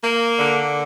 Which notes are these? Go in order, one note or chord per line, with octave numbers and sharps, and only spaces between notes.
A#3
D3